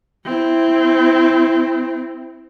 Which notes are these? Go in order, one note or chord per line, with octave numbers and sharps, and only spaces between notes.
C4 E4